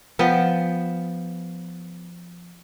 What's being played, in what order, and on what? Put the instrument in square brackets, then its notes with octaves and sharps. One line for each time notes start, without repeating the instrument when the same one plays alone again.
[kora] F3 B3 G5